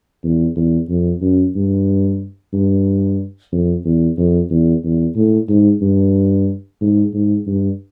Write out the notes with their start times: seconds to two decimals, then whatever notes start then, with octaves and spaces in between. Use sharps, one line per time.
0.24 E2
0.56 E2
0.89 F2
1.22 F#2
1.56 G2
2.53 G2
3.52 F2
3.85 E2
4.17 F2
4.51 E2
4.84 E2
5.16 A2
5.49 G#2
5.82 G2
6.81 G#2
7.14 G#2
7.47 G2